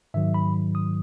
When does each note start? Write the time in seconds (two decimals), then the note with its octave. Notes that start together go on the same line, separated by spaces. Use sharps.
0.14 G#2 D#3 F#3 E5
0.34 B5
0.75 D#6